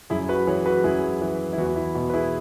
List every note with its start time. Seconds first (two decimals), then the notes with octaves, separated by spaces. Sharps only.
0.10 F#2 E4 G#4
0.28 F#4 B4
0.47 E3 G#4 C#5
0.66 F#4 B4
0.84 F#2 E4 G#4
1.21 E3
1.53 E4
1.58 E2 F#4
1.76 E4
1.95 B2
2.10 B4
2.14 E4 G#4